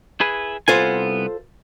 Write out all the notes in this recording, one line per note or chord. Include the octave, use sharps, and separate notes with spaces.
E4 G#4 B4
C2 B3 F4 A4 C5 G#5